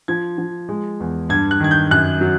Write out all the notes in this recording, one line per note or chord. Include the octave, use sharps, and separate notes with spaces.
F3 G#6
F3
G#3
E2
G2 G#6
F#6
D#3 G#6
G6
F#2 F#6
F#3